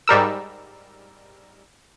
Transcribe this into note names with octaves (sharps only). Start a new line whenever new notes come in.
G#2 G3 A#4 E6